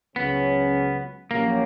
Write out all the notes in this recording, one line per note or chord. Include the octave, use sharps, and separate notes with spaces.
C#2 C#3 F#3 B3 C#4
A#1 A#2 F#3 A#3 C#4 G4